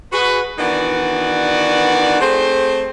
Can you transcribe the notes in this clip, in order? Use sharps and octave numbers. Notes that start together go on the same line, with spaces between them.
F#4 G#4 B4
D#3 E3 B3 D4 F#4 D5
A3 C4 G#4 C5